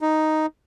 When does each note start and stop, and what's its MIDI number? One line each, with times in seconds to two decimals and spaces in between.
0.01 0.46 63